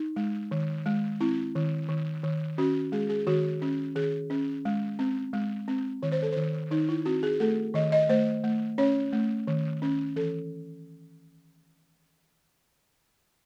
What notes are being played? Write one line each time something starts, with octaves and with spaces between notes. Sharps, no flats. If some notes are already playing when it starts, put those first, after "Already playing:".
Already playing: D#4
G#3
D#3
G#3
C4 E4
D#3
D#3
D#3
C#4 F#4
G#3 G#4
G#4
D#3 F#4
C#4
D#3 G#4
C#4
G#3
C4
G#3
C4
D#3 C#5
C5
A4
D#3 C5
D#3 D#4
E4
C4 F#4
G#4
A3 A4
D#3 D#5
D#5
A3 C5
A3
C#4 C#5
A3
D#3
C#4
E3 A4